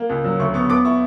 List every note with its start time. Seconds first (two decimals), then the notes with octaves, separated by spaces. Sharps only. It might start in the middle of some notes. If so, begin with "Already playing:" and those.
Already playing: A#3
0.10 C#2
0.24 F#3
0.39 D2 C#6
0.54 B3 C#6
0.69 B3 D6
0.85 E4 C#6